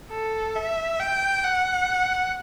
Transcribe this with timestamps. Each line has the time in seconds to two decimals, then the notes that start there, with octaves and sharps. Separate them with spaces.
0.11 A4
0.56 E5
0.99 G5
1.44 F#5